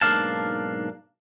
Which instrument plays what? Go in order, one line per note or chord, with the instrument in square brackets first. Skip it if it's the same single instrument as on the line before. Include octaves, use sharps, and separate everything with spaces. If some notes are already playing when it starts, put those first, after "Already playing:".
[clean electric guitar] B1 G#2 A#3 D4 F5 A5